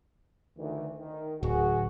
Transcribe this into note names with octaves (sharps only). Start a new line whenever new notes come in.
D2 D#3 E3
D#3
D1 F#4 G#4